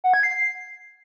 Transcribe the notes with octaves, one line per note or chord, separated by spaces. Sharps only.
F#5
G#6
C7